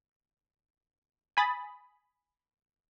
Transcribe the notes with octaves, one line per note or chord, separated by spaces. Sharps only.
G#5 B5 D#6 A6